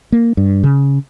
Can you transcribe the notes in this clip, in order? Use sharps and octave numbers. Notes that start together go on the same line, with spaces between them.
A#3
G2
C#3